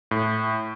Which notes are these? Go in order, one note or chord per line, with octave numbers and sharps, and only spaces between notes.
A2